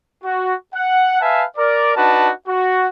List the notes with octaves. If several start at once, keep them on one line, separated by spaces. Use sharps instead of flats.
F#4
F#5
B4 E5 F5 G#5 A5
A#4 D5
D4 D#4 F#4 B4 A5
F#4